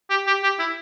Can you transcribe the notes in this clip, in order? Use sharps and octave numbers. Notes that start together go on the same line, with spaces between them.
G4
G4
G4
E4